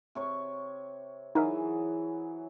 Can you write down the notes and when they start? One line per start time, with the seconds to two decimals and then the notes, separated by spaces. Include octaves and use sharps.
0.15 C3 C#5 C#6
1.35 E3 F#3 D#4 G#4 A#4 E5